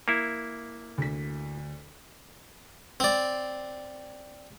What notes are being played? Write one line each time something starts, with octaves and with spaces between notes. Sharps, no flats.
A#3 E4
D2 B6
C4 D5